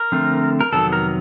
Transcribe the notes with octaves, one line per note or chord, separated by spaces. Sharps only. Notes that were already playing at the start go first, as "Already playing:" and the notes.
Already playing: A#4
D3 F3 A3 C4
A#4
F2 C3 D#3 F#3 B3 A4
A#4